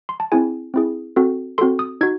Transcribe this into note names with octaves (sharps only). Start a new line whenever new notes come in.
C6
A5
C4 E4 G#4 G#5
C4 E4 G#4
C4 F#4 A4
C4 F#4 A4 C6
D#6
D#4 F#4 G#6